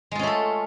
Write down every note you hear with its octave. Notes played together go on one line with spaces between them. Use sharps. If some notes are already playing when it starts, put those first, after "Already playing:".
G#3 A3 C#4 F4 A4